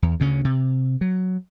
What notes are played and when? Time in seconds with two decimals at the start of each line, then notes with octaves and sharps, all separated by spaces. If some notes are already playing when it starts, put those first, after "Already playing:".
0.02 E2
0.20 D2 C#3 C#4
0.45 C3
1.01 F#3